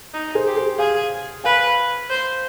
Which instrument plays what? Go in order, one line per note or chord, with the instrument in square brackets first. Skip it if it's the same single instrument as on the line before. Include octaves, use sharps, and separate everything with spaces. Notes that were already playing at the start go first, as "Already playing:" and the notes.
[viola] D#4
[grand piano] G#4 C5
[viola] G4
[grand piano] G#4 C5
[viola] G#4 [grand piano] F5 G#5
[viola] B4 [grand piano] F5 G#5
[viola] C5